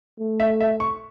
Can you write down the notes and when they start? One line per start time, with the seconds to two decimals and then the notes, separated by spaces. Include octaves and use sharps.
0.20 A3
0.40 E5
0.60 E5
0.80 C#6